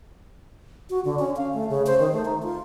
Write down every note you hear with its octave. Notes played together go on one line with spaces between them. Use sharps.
F#4
D3
C#4
F5
A3
C#3
C5
D#3
A3
D#4
F4